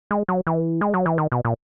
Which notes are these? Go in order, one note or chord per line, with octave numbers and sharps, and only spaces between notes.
G#3
F#3
E3
G#3
F#3
E3
D#3
B2
A#2